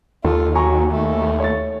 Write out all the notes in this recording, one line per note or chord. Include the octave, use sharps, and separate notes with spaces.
D#2 F4 A4
F#3 G#5 A#5 C#6
A3
C#5 A6